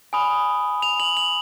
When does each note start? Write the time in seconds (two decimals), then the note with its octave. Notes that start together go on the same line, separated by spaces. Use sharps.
0.13 G#5 B5 D#6
0.82 F7
1.00 F#7
1.17 F#7